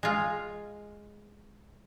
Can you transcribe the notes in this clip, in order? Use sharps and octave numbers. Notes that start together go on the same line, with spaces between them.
G#3 F4